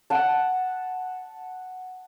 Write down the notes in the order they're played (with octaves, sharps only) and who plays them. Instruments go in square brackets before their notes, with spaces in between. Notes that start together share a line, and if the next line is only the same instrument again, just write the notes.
[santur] F#5 A5